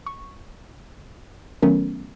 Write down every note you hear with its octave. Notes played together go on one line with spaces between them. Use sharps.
C#6
D#3 F#3 A3 B3 C#4 A#4